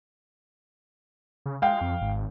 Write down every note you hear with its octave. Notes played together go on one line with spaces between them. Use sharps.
C#3
G#3 F5 G5
F2
G#1